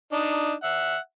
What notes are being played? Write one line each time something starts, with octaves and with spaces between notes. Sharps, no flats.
D4 D#4
E5 F#5